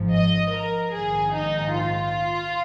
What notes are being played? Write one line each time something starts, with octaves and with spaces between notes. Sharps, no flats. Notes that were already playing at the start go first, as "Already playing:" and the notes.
Already playing: G#1 G#2 F3
D#5
A#4
A#1 G#2 D#3 G#4
D#4
F4